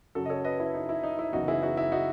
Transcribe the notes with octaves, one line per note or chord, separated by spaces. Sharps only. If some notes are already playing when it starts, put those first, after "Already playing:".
F#2 C#3 F#3 F#4 A4
D#5
A4 C#5
B4 D#5
E4
D#4
E4
D#4
E4
F#1 F#2 E3 B3 D#4 F#4
E4 G#4
D#4 F#4
E4 G#4
D#4 F#4